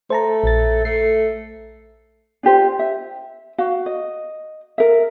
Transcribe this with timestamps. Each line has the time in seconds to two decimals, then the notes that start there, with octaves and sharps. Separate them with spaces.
0.10 A3 C5 A5 A#5
0.44 A#1 A6
0.85 A3 C7
2.43 D4 F4 G4 C5
2.79 E5
3.58 F#4 F5
3.86 D#5
4.78 A#4 E5